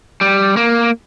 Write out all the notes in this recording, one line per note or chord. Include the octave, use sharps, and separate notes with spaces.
G3
A#3